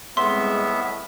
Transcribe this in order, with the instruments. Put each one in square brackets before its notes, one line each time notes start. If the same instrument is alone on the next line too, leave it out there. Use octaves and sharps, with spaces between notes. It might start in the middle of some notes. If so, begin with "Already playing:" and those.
[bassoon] A2 [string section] G3 G#3 C4 [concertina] B3 E5 [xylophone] C6